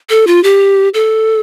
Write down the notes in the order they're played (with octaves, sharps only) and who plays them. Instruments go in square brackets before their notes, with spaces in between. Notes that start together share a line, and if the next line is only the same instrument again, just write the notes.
[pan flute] A4
F4
G4
A4